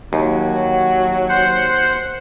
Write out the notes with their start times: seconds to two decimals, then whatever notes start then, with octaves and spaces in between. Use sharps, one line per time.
0.13 D#2 F#3
1.29 C5 F#5